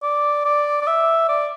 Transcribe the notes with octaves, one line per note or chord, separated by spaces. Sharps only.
D5
D5
D5
E5
D5